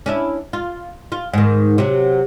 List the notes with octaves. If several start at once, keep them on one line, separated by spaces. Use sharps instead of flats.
C#4 D4 E4
F4
F4
G#2 D#3
C3 F#3